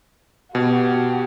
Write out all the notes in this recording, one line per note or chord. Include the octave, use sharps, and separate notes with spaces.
B2 F#4 G4